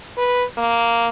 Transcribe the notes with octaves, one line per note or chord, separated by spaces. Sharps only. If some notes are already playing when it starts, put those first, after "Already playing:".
B4
A#3